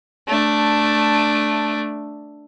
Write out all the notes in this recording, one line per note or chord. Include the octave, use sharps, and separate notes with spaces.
A3 D4